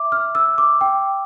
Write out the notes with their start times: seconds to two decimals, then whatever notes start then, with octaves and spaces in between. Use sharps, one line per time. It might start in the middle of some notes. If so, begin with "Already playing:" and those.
Already playing: E5 D6
0.12 F6
0.35 E6
0.58 D6
0.81 G5